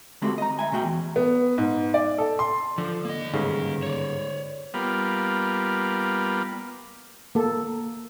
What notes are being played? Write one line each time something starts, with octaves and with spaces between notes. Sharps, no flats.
D3 G#3 A3 C4 F#4 G4
D#5 A#5
E5 G#5
B2 A3 F#4 G5
E2
B3
G#2
D5
A4
C6
D3 F3
A#3 D#5
G1 G#2 C#3
C#5 D5
G3 A#3 B3 F4
A#3 A4